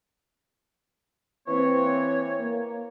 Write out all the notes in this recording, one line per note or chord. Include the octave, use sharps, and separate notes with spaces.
E3 A#3 C4 C#5
A#3